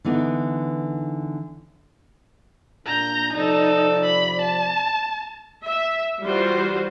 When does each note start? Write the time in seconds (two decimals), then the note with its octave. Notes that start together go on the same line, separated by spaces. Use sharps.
0.05 D3 E3 B3 D#4
2.86 A#2 D4 A#5 G6
3.34 C3 F3 D#4 A4 D5
4.05 B5
4.42 A5
5.65 E5
6.24 E3 G3 F4 F#4 C5